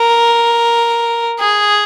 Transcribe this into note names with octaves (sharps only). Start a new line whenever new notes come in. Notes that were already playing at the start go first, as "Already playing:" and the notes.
Already playing: A#4
G#4